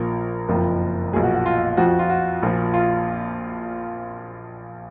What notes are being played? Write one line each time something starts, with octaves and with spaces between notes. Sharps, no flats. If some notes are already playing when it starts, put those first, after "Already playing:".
Already playing: A#1 A#2 F3 A#4
F#1 F2 F3 A#4
B1 A#2 F3 G#4
F#4
F#4
F4
F2 F3 F#4
F#4
F4
F#4
A#1 A#2 F3
F4